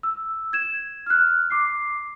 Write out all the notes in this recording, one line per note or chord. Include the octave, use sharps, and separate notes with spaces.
E6
G#6 E7
F6 F#6
D6 C7